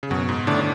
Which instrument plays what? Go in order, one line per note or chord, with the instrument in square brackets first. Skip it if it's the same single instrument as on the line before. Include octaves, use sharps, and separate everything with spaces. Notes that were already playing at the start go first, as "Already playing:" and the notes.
[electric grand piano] C#3
[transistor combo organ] F#2 [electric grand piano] B2
[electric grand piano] G#2
[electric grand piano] A2 [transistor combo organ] D3 A3 D4